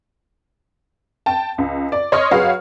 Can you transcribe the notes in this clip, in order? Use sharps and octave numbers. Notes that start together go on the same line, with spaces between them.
G5 A5
C#2
D5
C#5 D#5 C6 C#6 F6
F#3 F#4 G#4 B4 C#5 F5